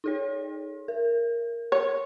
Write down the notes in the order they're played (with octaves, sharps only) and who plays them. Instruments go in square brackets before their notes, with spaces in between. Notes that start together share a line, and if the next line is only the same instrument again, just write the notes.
[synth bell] D#4 G#4 C#5
A#4
[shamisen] C#5